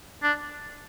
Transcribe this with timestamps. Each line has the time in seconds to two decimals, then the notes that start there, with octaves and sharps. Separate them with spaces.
0.23 D4